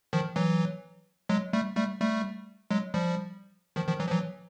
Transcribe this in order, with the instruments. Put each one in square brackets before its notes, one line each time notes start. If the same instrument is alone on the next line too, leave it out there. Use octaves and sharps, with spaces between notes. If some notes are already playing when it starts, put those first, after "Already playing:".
[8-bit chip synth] D#3 F3
E3 F#3
F#3 G#3
G3 A3
G3 A3
G3 A3
F#3 G#3
F3 G3
D#3 F3
D#3 F3
E3 F#3
F3
E3 F#3